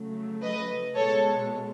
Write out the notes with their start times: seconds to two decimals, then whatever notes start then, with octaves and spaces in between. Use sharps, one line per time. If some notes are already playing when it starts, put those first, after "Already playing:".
Already playing: C#3 F#3 A3
0.42 B4 D#5
0.95 B2 G#3 A4 C#5